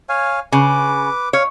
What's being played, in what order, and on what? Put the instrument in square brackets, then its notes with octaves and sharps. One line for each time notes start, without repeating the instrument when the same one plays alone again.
[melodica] C#5 F5 G#5
[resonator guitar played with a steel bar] C#3 [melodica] B4 D6
[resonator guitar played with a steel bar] C#5 [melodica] F5